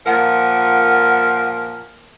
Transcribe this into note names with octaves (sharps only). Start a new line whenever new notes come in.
A#2 F3 A#4 F#5